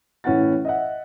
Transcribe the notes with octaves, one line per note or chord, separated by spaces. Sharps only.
A2 E3 C#4 E4 F#5 A6
D#5 E5 F#5